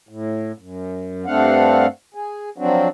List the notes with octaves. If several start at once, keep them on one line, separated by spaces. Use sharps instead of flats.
A2
F#2
G2 A3 C4 D4 F5 F#5
G#4
F3 F#3 C4 D4 F#4